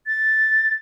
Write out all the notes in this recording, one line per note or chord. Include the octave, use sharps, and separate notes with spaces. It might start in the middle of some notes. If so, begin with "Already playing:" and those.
A6